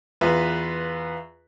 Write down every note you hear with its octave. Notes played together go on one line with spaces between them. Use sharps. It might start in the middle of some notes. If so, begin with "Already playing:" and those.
E2 F4 B4 E5